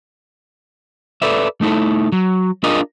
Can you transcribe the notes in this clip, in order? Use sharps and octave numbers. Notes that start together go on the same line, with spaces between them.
A4 B4 D5 E5
A3 D#4 E4 A4
F#3
D4 F4 G#4 A#4 D#5